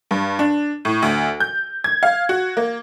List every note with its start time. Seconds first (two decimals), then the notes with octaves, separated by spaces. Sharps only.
0.11 G2
0.39 D4
0.85 A2
1.02 D2
1.40 G6
1.84 G#6
2.03 F5
2.29 F#4
2.57 A#3